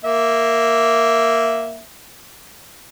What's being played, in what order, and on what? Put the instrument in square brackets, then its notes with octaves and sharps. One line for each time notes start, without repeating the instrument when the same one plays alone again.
[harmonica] A#3 E5